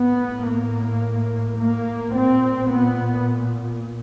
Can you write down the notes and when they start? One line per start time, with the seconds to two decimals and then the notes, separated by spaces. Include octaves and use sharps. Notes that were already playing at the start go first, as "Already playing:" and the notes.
Already playing: A2 B3
0.48 A#3
1.58 A#3
2.14 A#2 C4
2.70 B3